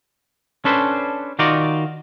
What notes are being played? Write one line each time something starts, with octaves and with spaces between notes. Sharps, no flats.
C#4 D4 A4 B4 C5
D#3 D#4 F4 F#4 D5